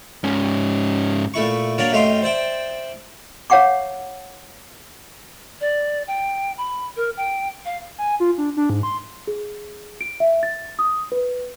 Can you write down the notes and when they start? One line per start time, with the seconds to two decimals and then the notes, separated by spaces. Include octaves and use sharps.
0.24 G#2 C#4
1.34 A#2 A3 E4 C#6
1.78 F#3 A#3 D4 A#4 C#5 D5
1.91 F#2 A3 G4 D#5 F5 C6
2.22 C5 D5 E5 G5
3.50 C#5 F5 F#5 C#6 D6
5.61 D5
6.07 G5
6.58 B5
6.96 A#4
7.17 G5
7.65 F5
7.98 G#5
8.20 F4
8.38 D4
8.57 D4
8.70 G#2
8.83 C6
9.27 G#4
10.01 D7
10.20 E5
10.43 A6
10.79 D#6
11.12 B4